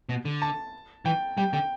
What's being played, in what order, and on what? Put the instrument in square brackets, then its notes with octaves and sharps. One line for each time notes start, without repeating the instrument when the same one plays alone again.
[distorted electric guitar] B2
D3
[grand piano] A5
[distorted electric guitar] E3 [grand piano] G5
[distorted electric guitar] G3 [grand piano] G5
[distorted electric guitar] D3 [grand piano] G5